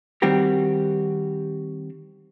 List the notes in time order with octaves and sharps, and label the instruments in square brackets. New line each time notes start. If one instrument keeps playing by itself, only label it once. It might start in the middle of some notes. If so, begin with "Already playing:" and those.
[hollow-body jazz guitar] D#3 G3 C4 F#4 G4 A#4